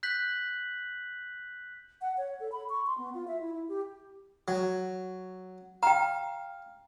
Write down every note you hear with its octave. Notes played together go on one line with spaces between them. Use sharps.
F#6 G6 B6 F#7
F#5
C#5
A4
B5
C#6
C6
B3
F4
E5
E4
E4
G4
F#3
F5 G5 A#5